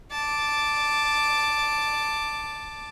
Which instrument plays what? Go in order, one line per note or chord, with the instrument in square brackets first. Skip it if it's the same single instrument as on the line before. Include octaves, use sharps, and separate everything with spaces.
[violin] A5 D6